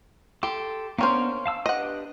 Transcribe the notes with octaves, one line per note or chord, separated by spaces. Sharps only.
G4 A4 C6
A#3 B3 C#4 D4 C5 F6
F5 A5 E6
D4 G4 B4 D#5 F#5